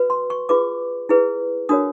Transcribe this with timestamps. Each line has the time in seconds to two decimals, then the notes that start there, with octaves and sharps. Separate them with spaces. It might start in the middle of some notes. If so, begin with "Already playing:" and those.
Already playing: F#4 B4
0.10 C6
0.30 C#6
0.49 F4 G#4 B4 D6
1.09 E4 G#4 B4
1.69 D4 F#4 A#4 C#5 D#6